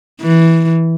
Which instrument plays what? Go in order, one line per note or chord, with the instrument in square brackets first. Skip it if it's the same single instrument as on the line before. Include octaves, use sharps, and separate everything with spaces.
[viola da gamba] E3